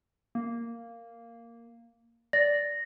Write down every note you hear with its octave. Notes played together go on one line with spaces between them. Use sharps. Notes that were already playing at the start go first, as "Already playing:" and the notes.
A#3
D5 A#6